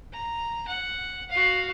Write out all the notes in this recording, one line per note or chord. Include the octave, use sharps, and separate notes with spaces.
A#5
F#5
F#4 F5